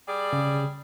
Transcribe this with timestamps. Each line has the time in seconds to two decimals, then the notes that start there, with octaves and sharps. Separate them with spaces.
0.08 G3 G#4 D5
0.33 C#3